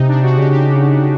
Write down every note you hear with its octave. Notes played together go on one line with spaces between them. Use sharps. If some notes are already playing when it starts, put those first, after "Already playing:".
Already playing: C3 D#4
D4
F#4
C#3 G4
G4